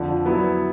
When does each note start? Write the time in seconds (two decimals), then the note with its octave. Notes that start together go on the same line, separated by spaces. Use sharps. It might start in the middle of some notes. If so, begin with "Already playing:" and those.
Already playing: F2 D3 F3
0.26 F#3 B3 E4